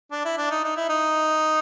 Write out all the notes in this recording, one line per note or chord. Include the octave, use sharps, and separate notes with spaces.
D4
E4
D4
D#4
D#4
E4
D#4